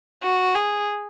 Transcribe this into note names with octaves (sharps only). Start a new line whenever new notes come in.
F#4
G#4